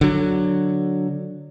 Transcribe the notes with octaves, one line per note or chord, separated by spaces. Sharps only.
D3 F#3